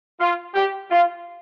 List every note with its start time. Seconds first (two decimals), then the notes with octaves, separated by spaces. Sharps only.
0.20 F4
0.55 G4
0.91 F4